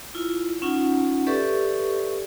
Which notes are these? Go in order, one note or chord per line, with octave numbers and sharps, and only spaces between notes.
E4 F4
C#4 D#4 F4 F#5
G4 A4 B4 D5 E5 C#6